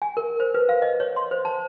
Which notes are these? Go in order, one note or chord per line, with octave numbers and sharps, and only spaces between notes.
G#5
A#4
C5
B4
F5
D#5
C#5
C6
C5
A5